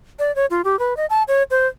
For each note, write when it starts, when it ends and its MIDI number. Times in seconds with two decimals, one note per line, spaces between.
0.19 0.34 74
0.36 0.46 73
0.50 0.61 65
0.64 0.78 67
0.79 0.96 71
0.97 1.06 75
1.10 1.23 81
1.28 1.43 73
1.50 1.67 72